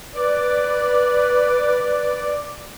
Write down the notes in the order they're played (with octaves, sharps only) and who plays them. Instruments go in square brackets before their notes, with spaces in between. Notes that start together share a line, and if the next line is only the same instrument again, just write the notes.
[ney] B4 [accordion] D5